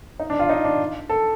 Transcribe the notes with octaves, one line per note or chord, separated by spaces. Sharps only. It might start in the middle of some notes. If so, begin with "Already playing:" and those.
D#4
D4
F4
D#4
D4
A4